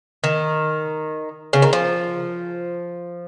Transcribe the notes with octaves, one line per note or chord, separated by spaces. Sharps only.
D#3
C#3
D#3
F3